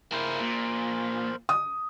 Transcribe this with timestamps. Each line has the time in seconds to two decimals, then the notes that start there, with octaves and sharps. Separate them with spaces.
0.12 A#3 E4 A#4 C5
0.39 A#2
1.49 D#6